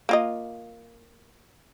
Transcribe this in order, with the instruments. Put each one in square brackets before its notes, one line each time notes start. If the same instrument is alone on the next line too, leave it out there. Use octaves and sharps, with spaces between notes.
[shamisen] A#3 F4 D#5